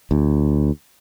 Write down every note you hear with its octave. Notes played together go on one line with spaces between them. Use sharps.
D2